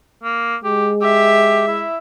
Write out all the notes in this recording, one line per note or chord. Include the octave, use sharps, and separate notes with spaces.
A#3
G#3 G4
G4 E5
E4